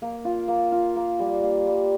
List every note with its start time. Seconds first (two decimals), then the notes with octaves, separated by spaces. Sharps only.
0.02 A#3
0.25 F4
0.48 A#3
0.72 F4
0.96 A#3
1.19 G3
1.43 A#3
1.67 G3